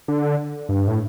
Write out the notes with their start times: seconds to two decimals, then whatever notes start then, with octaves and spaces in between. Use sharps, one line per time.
0.08 D3
0.69 G2
0.88 A2